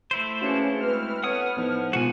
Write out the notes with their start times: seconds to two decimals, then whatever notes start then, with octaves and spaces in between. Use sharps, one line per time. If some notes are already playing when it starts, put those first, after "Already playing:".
0.11 A3 E4 C5
0.42 E3 A#3 C#4 D4 F#4 G#4 C#7
0.80 E3 G#3 C4 B4 F6
1.24 A3 B3 C#5 F#5 D#6
1.57 A2 F3 B3 D#4
1.93 B2 G#3 A#3 B3 F4 F#4 F#5 G#5